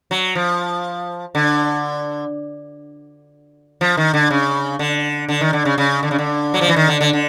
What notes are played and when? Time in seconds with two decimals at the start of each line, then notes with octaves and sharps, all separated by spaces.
0.11 F#3
0.35 F3
1.35 D3
3.81 F3
3.97 D#3
4.14 D3
4.30 C#3
4.79 D3
5.29 D3
5.41 D#3
5.53 D3
5.65 C#3
5.78 C#3
6.03 D3
6.11 C#3
6.18 D3
6.54 F#3
6.61 F3
6.69 E3
6.76 D#3
6.88 D3
7.01 D3
7.13 D3